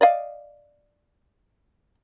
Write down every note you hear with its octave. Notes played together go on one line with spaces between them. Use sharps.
D5 D#5 F5